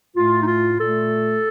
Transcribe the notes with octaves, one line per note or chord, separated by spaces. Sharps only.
A2 A3 F4
D#4
F4
A#2 A3 A4